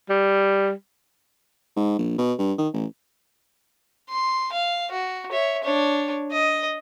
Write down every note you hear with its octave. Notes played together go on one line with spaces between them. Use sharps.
G3
G#2
A#1
B2
G2
D#3
A1
C6
F5
F#4
C#5 E5
D4 C#5
D#5